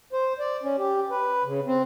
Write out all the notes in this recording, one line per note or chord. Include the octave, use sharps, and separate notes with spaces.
C5
D5
C#4
G4
B4
C#3
C4